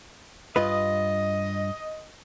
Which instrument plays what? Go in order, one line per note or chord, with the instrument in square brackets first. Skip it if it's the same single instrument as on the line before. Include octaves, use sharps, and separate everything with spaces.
[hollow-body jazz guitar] G2 F4 B4 [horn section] D#5